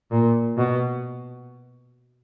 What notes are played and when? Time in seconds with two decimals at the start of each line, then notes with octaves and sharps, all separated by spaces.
0.11 A#2
0.58 B2